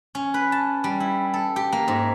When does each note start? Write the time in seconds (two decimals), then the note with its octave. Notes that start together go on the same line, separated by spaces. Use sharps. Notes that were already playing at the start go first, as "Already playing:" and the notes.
0.15 C#4
0.34 B4
0.52 A5
0.84 G3
1.00 E4
1.34 A4
1.56 G4
1.72 A#3
1.88 G#2